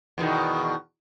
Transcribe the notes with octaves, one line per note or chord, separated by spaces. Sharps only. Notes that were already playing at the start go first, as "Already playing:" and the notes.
E2 B2 D#3